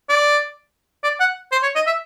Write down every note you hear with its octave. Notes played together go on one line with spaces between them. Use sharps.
D5
D5
F#5
C5
C#5
D#5
E5